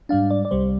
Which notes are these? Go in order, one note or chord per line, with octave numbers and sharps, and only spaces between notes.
G#2 G3 D4 F5
D5
D5
C2 C3 G3 C5